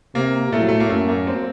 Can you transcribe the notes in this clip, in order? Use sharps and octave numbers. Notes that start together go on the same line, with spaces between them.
C3 A#3
A2 A3
F#3
A3
A#3
F#2 A3
A#3
C4